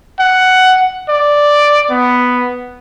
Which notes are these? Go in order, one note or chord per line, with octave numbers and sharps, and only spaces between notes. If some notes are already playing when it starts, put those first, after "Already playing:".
F#5
D5
B3